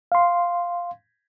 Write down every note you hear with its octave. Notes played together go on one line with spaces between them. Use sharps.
F5 C6